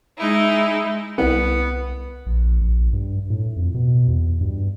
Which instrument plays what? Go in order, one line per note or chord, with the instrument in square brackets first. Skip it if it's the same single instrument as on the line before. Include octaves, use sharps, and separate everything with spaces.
[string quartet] G#3 D#4 E4
[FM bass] C2 [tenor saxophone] B3
[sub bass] A#1
A#1
G2
A2
F2
B2
E2
G2